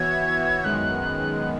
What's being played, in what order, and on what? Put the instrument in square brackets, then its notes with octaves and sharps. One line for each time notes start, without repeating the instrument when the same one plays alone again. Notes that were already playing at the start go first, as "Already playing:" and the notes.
Already playing: [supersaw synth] E3 B3 F#4 C#5 E5 [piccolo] G#6
[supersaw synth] F#2 D#3 G#3 B3 [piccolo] F#6